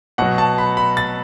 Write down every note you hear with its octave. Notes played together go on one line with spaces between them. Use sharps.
B2 F#3 F#5
A5
B5
B5
A6